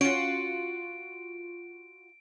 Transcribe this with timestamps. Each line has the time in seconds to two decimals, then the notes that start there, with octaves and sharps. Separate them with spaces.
0.01 C#4 F4 F#4 D7